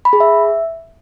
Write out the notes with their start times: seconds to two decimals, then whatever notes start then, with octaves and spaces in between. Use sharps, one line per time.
0.05 B5
0.13 G#4
0.20 E5